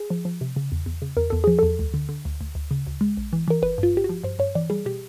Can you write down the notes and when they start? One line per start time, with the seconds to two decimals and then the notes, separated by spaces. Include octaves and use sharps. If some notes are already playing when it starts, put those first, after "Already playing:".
Already playing: G#4
0.10 F3
0.25 F3
0.41 C3
0.56 C#3
0.72 E2
0.86 E2
1.02 C#3
1.17 E2 A#4
1.30 E2 A4
1.44 F3 G#4
1.59 E2 A4
1.79 D2
1.94 D3
2.09 D3
2.25 D2
2.41 D2
2.55 D2
2.71 C#3
2.87 D2
3.01 G#3
3.17 A#1
3.33 E3
3.48 E3 A#4
3.62 G1 B4
3.78 G2
3.83 F4
3.93 G1 G4
4.04 F#4
4.09 F3
4.24 G2 C5
4.39 G2 C#5
4.55 E3 D5
4.70 G3 G#4
4.86 B2 G4